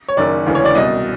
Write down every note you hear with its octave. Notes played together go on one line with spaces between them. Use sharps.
C#5
F#1 F#2 D#3 D5
E1 D2 C#3 E3
C#5
D5
C2 B2 D#5